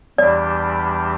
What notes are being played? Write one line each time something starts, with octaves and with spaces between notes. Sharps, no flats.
E2 E3 G3 D4 G4 D5